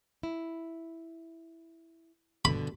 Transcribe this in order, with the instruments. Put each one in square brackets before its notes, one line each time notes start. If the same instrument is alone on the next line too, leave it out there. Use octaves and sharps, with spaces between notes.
[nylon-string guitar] E4
[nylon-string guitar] G2 B2 D3 [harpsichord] B5